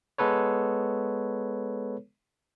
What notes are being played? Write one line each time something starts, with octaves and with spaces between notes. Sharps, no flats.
G#3 B3 A4 B4 C#5